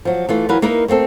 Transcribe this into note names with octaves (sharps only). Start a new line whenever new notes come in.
F3 F#3
E3 A3 F4
E3 F#3 F4 A#4 B4
A#3 D#4 E4 A#4 B4
A3 A#3 C4 A4